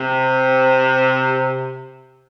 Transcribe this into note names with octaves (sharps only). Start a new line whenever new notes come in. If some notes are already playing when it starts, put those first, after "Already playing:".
Already playing: C3